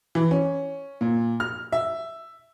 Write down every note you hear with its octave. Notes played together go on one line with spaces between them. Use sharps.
E3
C#4
A#2
F6
E5